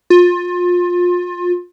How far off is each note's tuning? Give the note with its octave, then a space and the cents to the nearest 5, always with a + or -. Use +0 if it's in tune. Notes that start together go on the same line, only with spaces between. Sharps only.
F4 +25